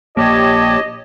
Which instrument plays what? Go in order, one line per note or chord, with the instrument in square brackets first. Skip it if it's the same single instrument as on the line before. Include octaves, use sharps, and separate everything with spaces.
[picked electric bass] A#1 A#3 [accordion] G4 C#5 A5 [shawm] D#5